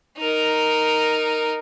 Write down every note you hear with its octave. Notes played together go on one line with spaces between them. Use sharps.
D#4 A#4